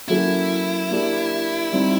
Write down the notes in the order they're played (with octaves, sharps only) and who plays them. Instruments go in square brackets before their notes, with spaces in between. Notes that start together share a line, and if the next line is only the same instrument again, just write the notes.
[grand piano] F#3 A#3 C#4 F#4 A4 [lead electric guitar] E4
[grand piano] A#3 D4 G4
G3 C4 D#4